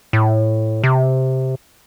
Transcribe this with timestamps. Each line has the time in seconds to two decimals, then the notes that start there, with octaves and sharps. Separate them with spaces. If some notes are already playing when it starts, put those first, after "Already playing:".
0.13 A2
0.83 C3